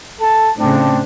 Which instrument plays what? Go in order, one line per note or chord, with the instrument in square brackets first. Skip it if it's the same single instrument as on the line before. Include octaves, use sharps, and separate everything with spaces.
[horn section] A4 A5
[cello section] A2 C#3 [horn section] C4 D4